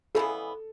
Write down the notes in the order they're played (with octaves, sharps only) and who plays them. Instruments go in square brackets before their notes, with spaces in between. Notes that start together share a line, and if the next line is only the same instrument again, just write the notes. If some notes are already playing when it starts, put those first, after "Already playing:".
[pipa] C#3 E3 G#3 B3 [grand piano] A4